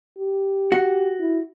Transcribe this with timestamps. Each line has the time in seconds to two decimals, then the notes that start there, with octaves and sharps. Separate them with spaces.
0.19 G4
0.72 F#4 F#5
1.20 E4